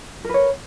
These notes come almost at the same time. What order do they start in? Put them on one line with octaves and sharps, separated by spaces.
A#4 B4 C#5